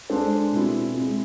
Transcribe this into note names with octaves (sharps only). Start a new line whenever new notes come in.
G#3 D4 A4 C5
B2 G#3 C4 E4
G#3 C4 E4